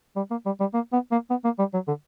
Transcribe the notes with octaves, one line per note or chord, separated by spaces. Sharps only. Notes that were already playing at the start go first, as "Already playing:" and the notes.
G3
A#3
G3
G3
A#3
B3
A#3
B3
A#3
G3
F#3
D3